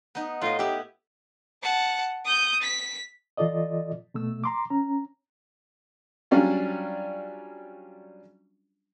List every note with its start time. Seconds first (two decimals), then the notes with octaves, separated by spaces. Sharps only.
0.15 B3 D#4
0.41 A2 F4 D#5
0.59 B3 E4 G4
1.63 F#5 A5
2.25 D#6 G6
2.62 B6
3.37 E3 F4 A4 D5 D#5
4.14 B2 A3 E6
4.44 A#5 C6 D6
4.70 C#4 A#5
6.31 F#3 G3 C#4 D4 F4